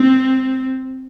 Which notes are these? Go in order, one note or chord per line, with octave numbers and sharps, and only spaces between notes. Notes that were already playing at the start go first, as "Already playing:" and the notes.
Already playing: C4